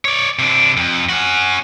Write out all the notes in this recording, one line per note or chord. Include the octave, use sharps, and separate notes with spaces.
C#5 D5
C3 D4
F2
C#4 F#4